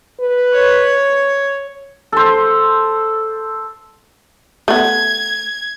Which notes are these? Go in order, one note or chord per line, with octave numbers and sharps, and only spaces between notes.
B4
C#5
A4 C5
A3 B3 G#6